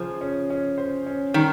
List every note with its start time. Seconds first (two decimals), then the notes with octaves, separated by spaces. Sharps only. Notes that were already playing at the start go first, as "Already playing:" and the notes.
Already playing: C#3 F3 C#4 G#4 C5
0.21 C#4
0.50 C#4
0.78 C5
1.06 C#4
1.34 D#3 G3